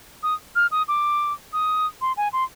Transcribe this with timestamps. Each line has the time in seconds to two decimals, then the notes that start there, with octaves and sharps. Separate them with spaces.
0.23 D#6
0.55 F6
0.71 D#6
0.88 D6
1.53 D#6
2.01 C6
2.17 G#5
2.33 C6